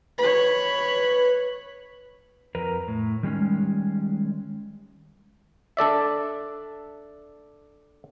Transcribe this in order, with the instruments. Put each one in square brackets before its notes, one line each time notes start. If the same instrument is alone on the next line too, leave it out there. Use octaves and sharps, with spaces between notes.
[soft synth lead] B4 [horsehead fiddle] C#5 B5
[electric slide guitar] F2 A#4 B4 A#5
A2
D#3 G3 G#3 C#4
[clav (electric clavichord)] D4 A4 D5 E5